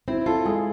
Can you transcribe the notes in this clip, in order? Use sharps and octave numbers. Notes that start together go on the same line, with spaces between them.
C4 E4
F4 A4
G#3 G#4